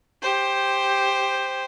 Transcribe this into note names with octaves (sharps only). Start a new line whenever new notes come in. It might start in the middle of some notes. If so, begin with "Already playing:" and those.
G4 C5